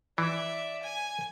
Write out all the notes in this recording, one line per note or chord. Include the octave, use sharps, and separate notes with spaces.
E3 D5 E5
G#5